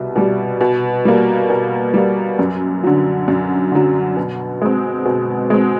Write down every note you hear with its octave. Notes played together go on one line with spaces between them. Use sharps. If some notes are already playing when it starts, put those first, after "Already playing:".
Already playing: C2 B2
B2 G3
B2
G3 A#3
B2
G3 A#3
F#2
D3 F#3
F#2
D3 F#3
B2
G#3 C4
B2
G#3 C4